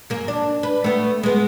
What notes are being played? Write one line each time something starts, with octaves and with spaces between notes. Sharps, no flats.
F#2 A#3
D4
B4
A3 B3
G#3 B3